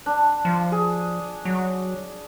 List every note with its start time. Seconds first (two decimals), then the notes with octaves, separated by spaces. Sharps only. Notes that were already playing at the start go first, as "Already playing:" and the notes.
0.06 D4
0.45 F3
0.72 G#4
1.45 F#3